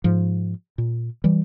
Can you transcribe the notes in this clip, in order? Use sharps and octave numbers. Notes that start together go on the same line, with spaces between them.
G#2 F3
A#2
E3 G3